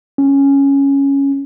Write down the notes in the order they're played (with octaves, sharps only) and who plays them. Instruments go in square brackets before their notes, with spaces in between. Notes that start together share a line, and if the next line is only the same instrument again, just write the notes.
[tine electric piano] C#4